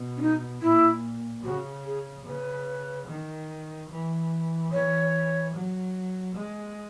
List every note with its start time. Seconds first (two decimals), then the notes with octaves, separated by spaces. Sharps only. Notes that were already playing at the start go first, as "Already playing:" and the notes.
Already playing: B2
0.16 C#4
0.21 D#4
0.62 A#2 E4
1.44 C#3 F#4
1.85 G#4
2.25 C#3 B4
3.07 D#3
3.90 E3
4.71 E3 C#5
5.54 F#3
6.35 G#3